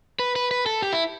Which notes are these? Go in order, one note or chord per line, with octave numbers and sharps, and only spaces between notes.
B4
B4
B4
A4
G4
E4